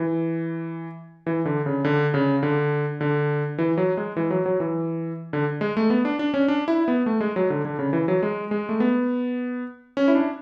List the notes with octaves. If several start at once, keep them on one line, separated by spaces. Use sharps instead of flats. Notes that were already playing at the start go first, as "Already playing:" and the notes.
Already playing: E3
E3
D3
C#3
D3
C#3
D3
D3
E3
F#3
G#3
E3
F#3
F#3
E3
D3
G#3
A3
B3
D4
D4
C#4
D4
E4
B3
A3
G#3
F#3
D3
D3
C#3
E3
F#3
G#3
G#3
A3
B3
C#4
E4
D4